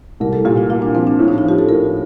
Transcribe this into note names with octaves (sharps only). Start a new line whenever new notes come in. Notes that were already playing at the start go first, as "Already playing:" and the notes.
C2 A#4
A4
A#2 G4
F4
A#3 F4
D4
F3 C4
D4
A2
D#4
F4
F3 G4
A4
A2 A#4